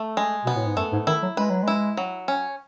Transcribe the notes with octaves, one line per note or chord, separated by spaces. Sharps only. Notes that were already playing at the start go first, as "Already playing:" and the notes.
Already playing: A3
G#3
B2 B3
A2
G#2
F#2 A3
G#2
D#3 E4
F#3
G#3 B4
F#3
G#3 E4
F#3
C#4